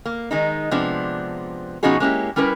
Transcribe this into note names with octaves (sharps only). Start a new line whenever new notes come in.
A#3
D#3 G#3 D#4
C3 F3 G#3 B3 D4
B2 F3 C#4 D#4 F#4 G#4
G#3 A#3 C#4 E4 G4
G3 C#4 E4 A#4 B4